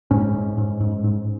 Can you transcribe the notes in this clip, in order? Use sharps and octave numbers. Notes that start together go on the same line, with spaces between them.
G#2 C#4
G#2
G#2
G#2
G#2